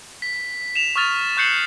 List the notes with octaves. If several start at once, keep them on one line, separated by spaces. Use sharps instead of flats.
B6
E7 F7
C#6 D#6 F6 A6 F7
C#6 F#6 G6 C7 C#7 F#7